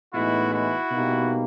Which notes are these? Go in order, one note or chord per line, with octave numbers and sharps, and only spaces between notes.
A2 E3 G#3 B3 D#4 E4 F#4
E4 F#4
B2 G3 A#3 D#4